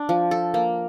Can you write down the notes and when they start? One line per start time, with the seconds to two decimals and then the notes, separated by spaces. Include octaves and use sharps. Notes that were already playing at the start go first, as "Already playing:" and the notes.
Already playing: D4
0.09 F3
0.31 A4
0.54 A#3